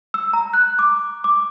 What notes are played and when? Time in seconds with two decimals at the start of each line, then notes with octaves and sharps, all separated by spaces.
0.14 E6
0.33 A#5
0.53 F#6
0.79 D6
1.24 D6